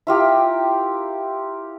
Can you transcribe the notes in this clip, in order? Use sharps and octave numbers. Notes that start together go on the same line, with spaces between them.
E4 F4 G4 A#4